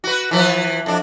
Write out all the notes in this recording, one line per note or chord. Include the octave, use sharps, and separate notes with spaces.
F#4 B4
E3 F3 B4
F2 D4